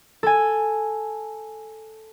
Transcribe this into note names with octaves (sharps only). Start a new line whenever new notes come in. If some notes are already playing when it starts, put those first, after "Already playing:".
A4 G#5